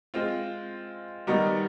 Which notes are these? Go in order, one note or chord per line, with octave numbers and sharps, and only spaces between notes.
G#3 C4 F4
D#3 G3 B3 D#4